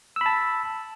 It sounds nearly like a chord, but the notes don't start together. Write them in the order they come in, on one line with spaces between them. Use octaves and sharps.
E6 B5 A5